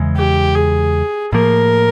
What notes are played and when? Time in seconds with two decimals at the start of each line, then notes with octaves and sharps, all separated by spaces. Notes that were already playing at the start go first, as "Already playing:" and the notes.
Already playing: E2 C#3 E3 G#3
0.17 G4
0.55 G#4
1.33 A2 F3 A#3 A#4